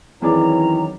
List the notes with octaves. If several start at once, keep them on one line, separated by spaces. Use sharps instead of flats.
F2 D#3 E3 F#3 C#4 G#4 D5 A#5